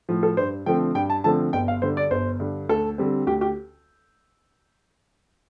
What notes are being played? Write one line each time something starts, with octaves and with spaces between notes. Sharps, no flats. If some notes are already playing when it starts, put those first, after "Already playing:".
A2 F3
A4
G2 C5
D3 F3 A3 C4 G5
G2 G5
A5
D3 F3 A3 C4 A5
G1 G5
F5
G2 D3 C5
D5
G1 C5
G2 D3
D2 A4
D3 G3 C4
D2 G4
G4